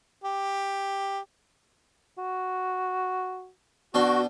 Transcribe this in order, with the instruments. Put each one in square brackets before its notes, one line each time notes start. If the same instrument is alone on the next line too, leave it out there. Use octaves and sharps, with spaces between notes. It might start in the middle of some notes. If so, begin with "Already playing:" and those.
[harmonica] G4
[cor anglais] F#4
[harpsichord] B2 D4 G5 [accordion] F#4